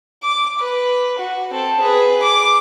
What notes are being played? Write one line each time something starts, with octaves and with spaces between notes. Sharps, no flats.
D6
B4
F#4
C4 A4
G#4 B4
D6